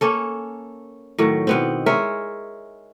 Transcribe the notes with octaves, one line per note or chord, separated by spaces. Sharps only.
A#3 C#4 A4
A2 D#3 F#3
B2 B3 C4
G#3 A#4 C#5 E5